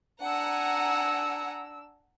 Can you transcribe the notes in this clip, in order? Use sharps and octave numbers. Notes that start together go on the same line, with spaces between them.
D4 F#5 G#5 A#5 E6